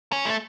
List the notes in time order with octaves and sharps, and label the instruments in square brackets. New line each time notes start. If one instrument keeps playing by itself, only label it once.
[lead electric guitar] C#4
A3